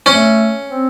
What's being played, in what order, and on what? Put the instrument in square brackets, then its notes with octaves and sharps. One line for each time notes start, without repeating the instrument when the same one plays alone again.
[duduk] A3 [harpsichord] C#4
[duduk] C4